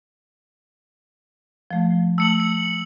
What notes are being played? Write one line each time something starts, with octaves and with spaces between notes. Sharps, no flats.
F3 A3
A3 E6 C#7 F#7
C#7